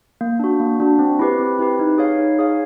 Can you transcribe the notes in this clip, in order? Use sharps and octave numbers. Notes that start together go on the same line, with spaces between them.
A#3
D4 F#4
A#3
D4 F#4
C4
E4 G4 B4
C4
E4 G4 B4
D#4
G#4 C#5 F5
D#4
G#4 C#5 F5